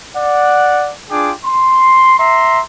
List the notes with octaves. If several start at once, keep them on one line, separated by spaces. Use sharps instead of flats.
D5 F#5
D4 F4 G#4 G5 D6
C6
E5 A#5 C6